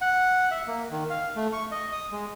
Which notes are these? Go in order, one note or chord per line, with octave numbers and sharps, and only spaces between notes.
F#5
E5
A#3
D#3
F5
A3
C#6
D#5
D#6
G#3